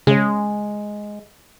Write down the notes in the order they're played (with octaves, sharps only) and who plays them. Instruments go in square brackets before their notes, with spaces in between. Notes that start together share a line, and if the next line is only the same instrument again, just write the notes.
[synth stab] C#3 [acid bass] G#3